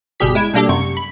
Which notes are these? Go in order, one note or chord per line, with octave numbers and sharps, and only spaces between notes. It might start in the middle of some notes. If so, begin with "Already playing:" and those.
G1 B2 G3 G4 G#4 B6
G#3 E4 G#6 D7
B2 G3 A#3 D4 G4 A4
F#2 C3 C#6
B5